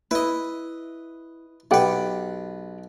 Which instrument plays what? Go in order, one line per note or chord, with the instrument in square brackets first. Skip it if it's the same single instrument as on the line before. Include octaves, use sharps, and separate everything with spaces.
[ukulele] E4 [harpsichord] B4 D#5
[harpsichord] B1 B4 [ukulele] G4 F#5 G5